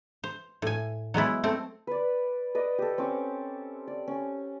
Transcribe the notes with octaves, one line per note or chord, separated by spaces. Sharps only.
C5
A2 G#5
F#3 G#3 B3 E4
A3 C4
B4 D5
B4 D5 D#5
G4 A4
C4 C#4 C#6 D6
D5
C#4